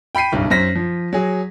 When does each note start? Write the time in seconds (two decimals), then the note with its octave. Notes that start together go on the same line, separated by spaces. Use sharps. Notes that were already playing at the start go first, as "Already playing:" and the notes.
0.15 G5 B5 B6 C7 D#7
0.32 F#1 B1 G2
0.50 F#2 C5 A#6 B6
0.75 F3
1.13 F#3 G#4